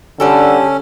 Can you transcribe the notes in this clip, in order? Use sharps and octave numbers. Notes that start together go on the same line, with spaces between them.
D3 G3 C#4 G4 A4